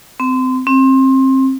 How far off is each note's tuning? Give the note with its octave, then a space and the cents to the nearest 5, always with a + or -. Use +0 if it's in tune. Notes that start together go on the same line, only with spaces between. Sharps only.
C4 -25
C4 +25